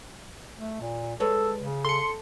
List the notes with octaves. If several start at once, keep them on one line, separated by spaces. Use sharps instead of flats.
A3
A#2
G#3 A4 B4 C#5
C#3
A4 C6 C#7